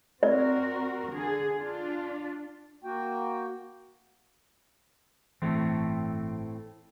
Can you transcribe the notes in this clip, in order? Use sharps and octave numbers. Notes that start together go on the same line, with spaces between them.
C4 F#4 A#4 D5
D3 G#4
D4 F4
A#3 F#4 G5
G1 A2 E3 A3 C4